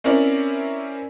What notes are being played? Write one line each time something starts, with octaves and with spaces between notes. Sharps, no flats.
C4 C#4 E4 A#4 D5